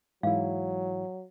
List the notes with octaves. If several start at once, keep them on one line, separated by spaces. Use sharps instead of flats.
G#2 E3 F#3 E4 F5